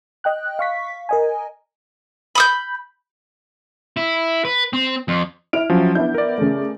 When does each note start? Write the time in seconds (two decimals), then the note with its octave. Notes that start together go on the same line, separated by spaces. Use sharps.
0.24 D#5 G5 F#6
0.59 F5 C#6 B6
1.09 A#4 D#5 G#5
2.35 B5 D#6 G6
3.97 E4
4.45 B4
4.73 C4
5.08 F2
5.53 E4 F6 D7 F7
5.70 F3 F#3 C#4
5.95 B3 D4 E4 G6
6.14 A#4 D5
6.38 C#3 A3